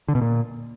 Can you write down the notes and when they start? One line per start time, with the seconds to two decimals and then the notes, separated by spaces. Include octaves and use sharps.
0.08 D3
0.15 B2
0.22 A#2